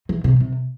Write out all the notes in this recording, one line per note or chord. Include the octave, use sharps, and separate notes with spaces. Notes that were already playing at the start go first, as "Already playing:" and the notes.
E3
C3
C3